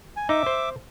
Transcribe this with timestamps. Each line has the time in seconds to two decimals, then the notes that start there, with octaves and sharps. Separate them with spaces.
0.17 G#5
0.29 D#4 E5 D6
0.46 C5